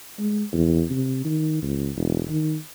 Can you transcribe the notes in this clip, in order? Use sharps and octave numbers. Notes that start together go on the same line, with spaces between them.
G#3
E2
C3
D#3
C#2
E1
D#3